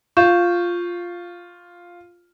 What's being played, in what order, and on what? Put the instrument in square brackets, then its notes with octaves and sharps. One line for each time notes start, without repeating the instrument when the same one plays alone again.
[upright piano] F4 [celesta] C#6 G6 E7